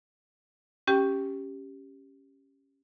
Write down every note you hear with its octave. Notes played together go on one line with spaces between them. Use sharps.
C#4 G4 G5